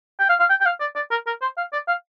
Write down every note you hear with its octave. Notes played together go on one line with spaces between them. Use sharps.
G5
F5
F5
G5
G5
F5
D5
D5
A#4
A#4
C5
F5
D5
F5